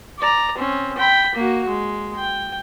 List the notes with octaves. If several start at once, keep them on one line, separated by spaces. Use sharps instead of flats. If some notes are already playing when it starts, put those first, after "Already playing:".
D5 A#5
C4 C#4
G5 B5
A#3 F#4
G#3
G5